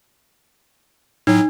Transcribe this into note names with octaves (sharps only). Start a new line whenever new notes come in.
A2 F#3 D#4